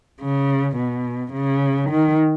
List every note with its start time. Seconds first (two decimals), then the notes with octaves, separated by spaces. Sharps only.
0.20 C#3
0.77 B2
1.34 C#3
1.90 D#3